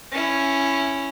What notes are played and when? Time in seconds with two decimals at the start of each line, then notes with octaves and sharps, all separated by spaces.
0.12 C#4 E4